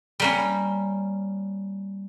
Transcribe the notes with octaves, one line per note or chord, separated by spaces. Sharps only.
G3 A#3 C#4